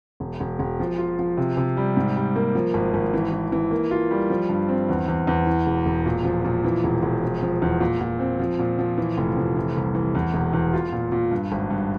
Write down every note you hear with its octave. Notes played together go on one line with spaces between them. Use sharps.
E1
E1
E1
F3
F4
F3
C3
C3
G3
G#2
G3
A#3
F3
G#1
G#1
E3
E3
E3
A#3
F4
G3
F3
G2
C4
E2
E2
E2
E3
E1
E1
A#2
F3
A#2
E3
E1
E1
F3
F3
E2
A#2
A#2
C4
F3
A#2
F3
E3
F1
F1
E3
C2
E3
E2
E1
E2
F4
A#2
A#2
G2
G#1
G2